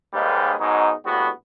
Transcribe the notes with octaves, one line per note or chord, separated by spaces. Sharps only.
D#2 G#2 G3 G#3 A#3 B4
G#2 B2 F#3 D#4
A#1 A2 G3 B3 F#4